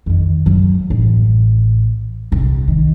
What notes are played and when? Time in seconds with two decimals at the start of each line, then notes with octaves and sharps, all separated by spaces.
0.06 F2 D#3
0.46 F#2
0.90 A1
2.32 C2 C3
2.68 D#3